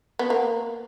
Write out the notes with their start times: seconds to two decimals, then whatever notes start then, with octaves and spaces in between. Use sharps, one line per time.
0.19 B3
0.30 A#3